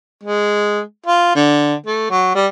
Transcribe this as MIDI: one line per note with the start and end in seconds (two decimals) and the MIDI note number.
0.24 0.80 56
1.06 1.33 65
1.35 1.74 50
1.86 2.10 57
2.10 2.31 54
2.35 2.47 55